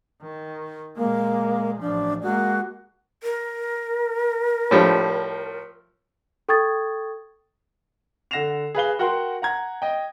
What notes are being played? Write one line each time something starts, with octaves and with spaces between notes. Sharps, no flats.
D#3
A#2 G#3 A#3
A1 F3 D4
G#3 A#3 F#4
A#4
A2 F3 G3
A4 G5 C#6 D#6 G#6 A6
D3 F#5 A#6 C7 E7 F7
G#4 B4 F5 G7
F#4 A#4 F#5 G5 C6
F#5 A#5 G#6
D#5 G5